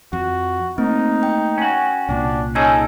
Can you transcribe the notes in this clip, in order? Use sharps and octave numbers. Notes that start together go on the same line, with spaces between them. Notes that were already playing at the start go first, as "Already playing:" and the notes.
F2 F#4
A3 A#3 C4 D#4
G5
C#4 F#4
C2 A#2 D4
C#4 D#4 G#4 A4 G#5 E6 G#6